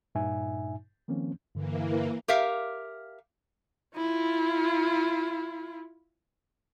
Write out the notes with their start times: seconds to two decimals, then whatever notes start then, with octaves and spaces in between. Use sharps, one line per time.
0.15 G2 A#2 D#4 E5 G#5
1.08 D#3 F3 A#3 C4 C#4
1.55 G2 D3 E3 A#3
2.28 G4 A#4 E5 F5
3.97 E4 F4